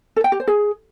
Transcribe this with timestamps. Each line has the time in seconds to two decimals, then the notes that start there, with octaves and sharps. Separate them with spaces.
0.16 A4
0.24 G5
0.32 G4
0.40 C5
0.47 G#4